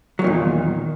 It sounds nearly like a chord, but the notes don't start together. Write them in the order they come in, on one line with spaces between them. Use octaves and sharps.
F#3 E2 D#3 A#2